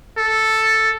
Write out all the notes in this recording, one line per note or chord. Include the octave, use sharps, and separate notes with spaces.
A4